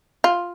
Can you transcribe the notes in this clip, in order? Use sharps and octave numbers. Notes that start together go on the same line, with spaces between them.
F4